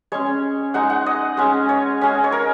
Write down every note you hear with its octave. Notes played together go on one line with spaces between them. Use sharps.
G#3 C#4 C#5
G#3 D#4 F#5
F#5
D#5
G#3 C#4
C#5
G#3 C#4
C#5
A#4